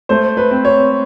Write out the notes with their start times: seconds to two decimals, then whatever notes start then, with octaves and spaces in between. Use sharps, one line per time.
0.09 A3 C5
0.37 B4
0.51 C4
0.65 C#5